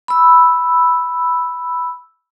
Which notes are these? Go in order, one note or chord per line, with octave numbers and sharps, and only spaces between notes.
B5 E6